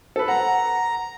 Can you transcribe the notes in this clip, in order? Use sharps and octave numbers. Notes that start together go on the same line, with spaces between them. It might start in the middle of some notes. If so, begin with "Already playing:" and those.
A4 B4
F#5 A#5